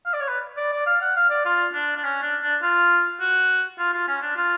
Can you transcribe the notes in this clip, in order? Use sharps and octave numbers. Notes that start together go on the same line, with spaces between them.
F5
D5
C#5
B4
D5
D5
F5
F#5
F5
D5
F4
D4
D4
C#4
D4
D4
F4
F#4
F4
F4
C#4
D4
F4